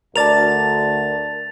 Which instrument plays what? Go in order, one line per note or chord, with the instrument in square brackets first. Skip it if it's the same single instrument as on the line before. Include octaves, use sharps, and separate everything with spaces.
[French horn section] D2 [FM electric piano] A#4 D5 A5 [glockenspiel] A6 F7